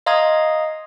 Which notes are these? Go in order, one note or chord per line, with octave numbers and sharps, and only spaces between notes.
D#5 F5 A#5 C6 D#6 G#6